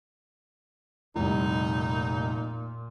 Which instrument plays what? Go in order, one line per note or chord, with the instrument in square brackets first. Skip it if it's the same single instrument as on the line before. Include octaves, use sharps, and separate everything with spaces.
[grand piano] F1 C2 [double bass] A#2 [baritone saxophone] D#4